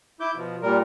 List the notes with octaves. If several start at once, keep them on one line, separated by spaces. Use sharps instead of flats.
E4 D6 G6
B2 F3
A#2 G3 A#4